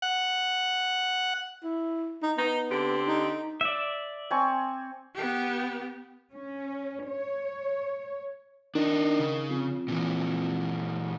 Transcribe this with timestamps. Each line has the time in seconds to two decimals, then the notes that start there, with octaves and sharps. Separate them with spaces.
0.02 F#5
1.63 E4
2.22 D#4
2.38 B3 D#4
2.70 D3 C4 G4
3.08 D#4
3.61 D5 E5
4.31 C4 G#5 C#6
5.15 B3 G4
6.33 C#4
7.08 C#5
8.75 D#3 D4 D#4
9.19 C#3
9.50 F2
9.88 A#2 E3